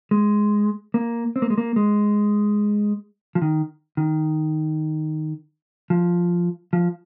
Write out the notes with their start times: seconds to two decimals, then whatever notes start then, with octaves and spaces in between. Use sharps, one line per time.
0.11 G#3
0.94 A#3
1.36 C4
1.42 A#3
1.50 G#3
1.58 A#3
1.76 G#3
3.35 F3
3.42 D#3
3.97 D#3
5.90 F3
6.73 F3